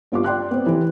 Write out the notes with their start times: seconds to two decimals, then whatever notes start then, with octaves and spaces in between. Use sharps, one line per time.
0.12 G2 B3 F4 B4 D6
0.24 D5 G5 C6 F#6
0.51 B3 C4
0.66 E3 G4